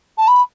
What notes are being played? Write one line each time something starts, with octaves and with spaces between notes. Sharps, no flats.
A5
B5